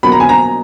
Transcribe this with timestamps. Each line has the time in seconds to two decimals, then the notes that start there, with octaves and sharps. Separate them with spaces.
0.03 B2 F#3 A#3 B5
0.12 A#5
0.20 G#5
0.29 A#5